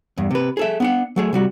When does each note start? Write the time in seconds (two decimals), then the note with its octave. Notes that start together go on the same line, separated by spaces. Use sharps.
0.18 E2 G2
0.31 C3 B4
0.57 G#4 A4 E5
0.80 B3 D4 F#5
1.16 F#3 A3 G#4
1.33 C3 G3 F#4